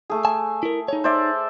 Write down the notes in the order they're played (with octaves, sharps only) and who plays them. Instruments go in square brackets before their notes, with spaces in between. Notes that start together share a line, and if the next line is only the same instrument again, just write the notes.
[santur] A3 G#4
[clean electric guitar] G#5 A5
E4 A#4
D#4 C#5
[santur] C5 D5 E5